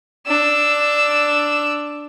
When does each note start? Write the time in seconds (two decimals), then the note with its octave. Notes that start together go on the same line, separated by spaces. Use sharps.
0.27 D4 E6